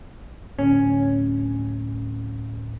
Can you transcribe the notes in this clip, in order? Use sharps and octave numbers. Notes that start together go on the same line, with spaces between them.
D1 C#4